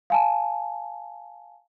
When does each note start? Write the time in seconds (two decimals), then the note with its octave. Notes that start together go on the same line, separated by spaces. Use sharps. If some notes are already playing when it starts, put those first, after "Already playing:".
0.10 F5 G#5 A5